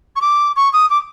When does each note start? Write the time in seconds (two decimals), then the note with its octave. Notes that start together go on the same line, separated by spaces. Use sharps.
0.16 C#6
0.21 D6
0.56 C#6
0.73 D#6
0.90 D6